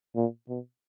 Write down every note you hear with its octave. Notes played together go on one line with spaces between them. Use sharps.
A#2
B2